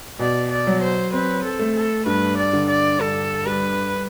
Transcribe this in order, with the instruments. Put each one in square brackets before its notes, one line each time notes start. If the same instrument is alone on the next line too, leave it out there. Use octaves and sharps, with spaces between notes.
[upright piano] B2 [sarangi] D5
[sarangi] D5
[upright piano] F#3
[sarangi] C5
[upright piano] C4 [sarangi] B4
[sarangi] A4
[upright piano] A3
[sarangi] A4
[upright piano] G2 [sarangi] B4
[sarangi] D5
[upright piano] D3
[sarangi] D5
[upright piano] G2 [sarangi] A4
[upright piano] G3 [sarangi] B4